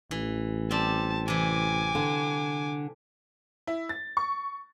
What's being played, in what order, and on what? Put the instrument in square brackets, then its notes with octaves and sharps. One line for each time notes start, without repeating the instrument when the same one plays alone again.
[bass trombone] A1 [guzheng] E3
[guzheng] G3 C4 [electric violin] A5
[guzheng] C3 E3 [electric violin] G#5 D6
[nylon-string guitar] D3
[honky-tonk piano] E4
A6
C#6